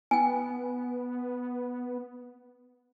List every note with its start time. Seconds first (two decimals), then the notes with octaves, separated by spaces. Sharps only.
0.11 B3 G5 G#5